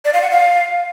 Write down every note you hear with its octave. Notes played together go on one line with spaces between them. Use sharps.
D5
F5
F#5
F5